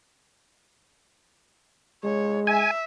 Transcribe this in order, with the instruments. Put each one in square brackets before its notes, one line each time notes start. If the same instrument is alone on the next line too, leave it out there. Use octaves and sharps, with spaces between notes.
[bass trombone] G#3 [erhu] C#5
[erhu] E5 [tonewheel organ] G#5